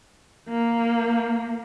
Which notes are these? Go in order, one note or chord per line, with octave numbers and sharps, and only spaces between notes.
A#3